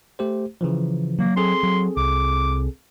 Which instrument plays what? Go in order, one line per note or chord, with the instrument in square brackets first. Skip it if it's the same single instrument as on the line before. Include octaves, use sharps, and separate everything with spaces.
[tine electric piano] A3 G4 C5
C#3 E3 F3
[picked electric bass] F#3 [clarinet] A#3
[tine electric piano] C4 G#4 A4 [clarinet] C6
[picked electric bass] F#3
[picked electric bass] C2 [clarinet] D6